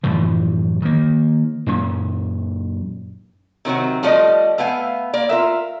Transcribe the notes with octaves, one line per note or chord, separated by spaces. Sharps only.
F#2 A2 E3 F3
D#3 A#3
F#2 A#2 C#4
C3 D#3 F#3 C4
F3 G3 A3 C#4 D5 D#5
A3 B3 F5 G5 G#5
A#3 D5
F4 A#4 E5